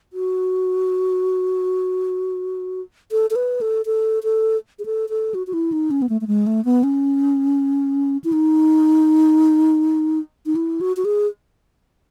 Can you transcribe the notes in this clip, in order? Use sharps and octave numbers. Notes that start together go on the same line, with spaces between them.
F#4
A4
A4
B4
A4
A4
A4
G#4
A4
A4
F#4
F#4
E4
D#4
C#4
B3
A3
A3
G#3
A3
B3
C#4
E4
D#4
D#4
E4
F#4
F#4
G#4